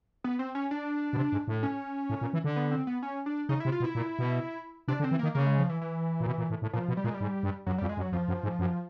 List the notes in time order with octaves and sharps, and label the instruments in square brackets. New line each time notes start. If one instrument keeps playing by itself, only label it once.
[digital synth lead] B3
C4
C#4
D4
[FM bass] B2
C3
G#2
A2
[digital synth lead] C#4
[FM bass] A2
A#2
E3
D3
[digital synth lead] B3
C4
B3
C#4
D4
[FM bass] C#3 [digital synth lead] D#4
[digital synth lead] E4
[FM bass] C3
[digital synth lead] F4
[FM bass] B2
[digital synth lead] E4
[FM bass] A#2
B2
[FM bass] C3 [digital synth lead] D4
[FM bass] D3
[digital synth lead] C4
[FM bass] E3
[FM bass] D#3 [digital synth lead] A#3
[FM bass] C#3 [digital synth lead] A#3
[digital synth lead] G#3
F3
E3
E3
[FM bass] A#2
B2
A#2
A2
A2
[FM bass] A#2 [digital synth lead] F3
[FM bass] B2
[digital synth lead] G3
[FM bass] A#2 [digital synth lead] G#3
[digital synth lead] G3
[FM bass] G#2
G2
[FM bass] F#2 [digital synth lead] F#3
[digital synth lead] G3
[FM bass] F2
[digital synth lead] G#3
[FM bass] F#2
[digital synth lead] F#3
[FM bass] F2 [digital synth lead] F3
[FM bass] F#2
G#2
F#2